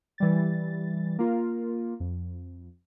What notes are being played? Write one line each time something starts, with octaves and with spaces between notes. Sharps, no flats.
E3 G3 A6
A#3 F4 A#4
F2